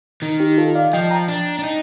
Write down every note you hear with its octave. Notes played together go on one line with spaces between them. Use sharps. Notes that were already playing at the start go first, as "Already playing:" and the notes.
D#3 D#4
D#4 G4
F4 A4
D5 F5
F3 D#5 G5
G5 A#5
D4
D4
D#4